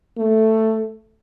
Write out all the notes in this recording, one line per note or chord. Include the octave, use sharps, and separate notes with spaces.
A3